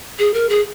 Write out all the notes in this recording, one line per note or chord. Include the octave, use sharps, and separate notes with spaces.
G#4
A#4
G#4